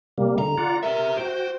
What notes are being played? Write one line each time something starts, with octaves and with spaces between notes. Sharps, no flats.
C3 G3 A#3
D3 A#5
F4 D5 F#5
G4 A#4 E5
F#4 C5 G5